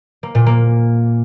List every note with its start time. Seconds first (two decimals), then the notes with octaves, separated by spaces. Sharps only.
0.23 A#3
0.35 A#2
0.46 A#3